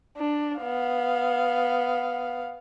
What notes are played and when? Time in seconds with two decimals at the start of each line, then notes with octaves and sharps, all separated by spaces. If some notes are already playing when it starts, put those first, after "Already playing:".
0.17 D4
0.59 B3 F5